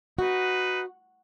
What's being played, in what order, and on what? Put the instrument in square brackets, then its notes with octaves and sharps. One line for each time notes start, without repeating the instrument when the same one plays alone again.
[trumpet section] D#4 B4 [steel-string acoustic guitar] F#4